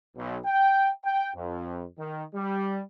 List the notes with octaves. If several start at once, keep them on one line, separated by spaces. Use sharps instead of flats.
B1
G5
G5
F2
D#3
G3